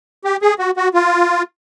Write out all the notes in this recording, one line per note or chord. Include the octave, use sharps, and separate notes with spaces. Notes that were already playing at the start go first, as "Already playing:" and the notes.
G4
G#4
F#4
F#4
F4